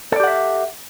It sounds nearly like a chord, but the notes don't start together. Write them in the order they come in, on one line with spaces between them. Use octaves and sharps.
A4 D5 G4 F#5 E5